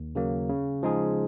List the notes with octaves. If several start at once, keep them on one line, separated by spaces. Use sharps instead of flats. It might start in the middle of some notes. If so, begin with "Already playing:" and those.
Already playing: D#2
C#3 F#3 A#3
C#3
F3 G#3 D#4 G#4